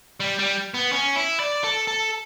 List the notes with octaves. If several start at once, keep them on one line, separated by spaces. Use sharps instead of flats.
G3
G3
B3
C#4
E4
D5
A4
A4